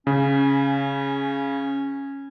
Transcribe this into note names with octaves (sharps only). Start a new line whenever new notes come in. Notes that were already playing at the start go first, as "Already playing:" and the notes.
C#3 C#4